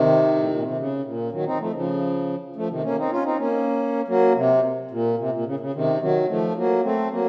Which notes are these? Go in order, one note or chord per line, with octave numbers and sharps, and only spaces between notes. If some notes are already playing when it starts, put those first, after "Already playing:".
Already playing: C3 D#3
A2
A#2
C3
C#3
A#2
D#3 F#3
C4 D#4
F3 A3
C#3 F3
F3 A3
C3 D#3
A#3 C#4
C4 D#4
C#4 F4
C4 D#4
A#3 C#4
F#3 A#3
C3
A#2
C3
A#2
C#3
C#3
C3 D#3
D#3 F#3
F3 A3
F#3 A#3
A3 C4
F#3 A#3